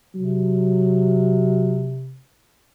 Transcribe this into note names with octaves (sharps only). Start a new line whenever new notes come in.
C3 F#3